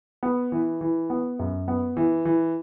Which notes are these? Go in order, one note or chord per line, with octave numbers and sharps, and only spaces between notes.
B3
E3
E3
B3
F#2
B3
E3
E3